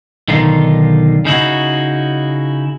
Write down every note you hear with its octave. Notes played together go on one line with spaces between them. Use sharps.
B1 D3 D#3 D#4 F4
C#3 D#4 E4 F#4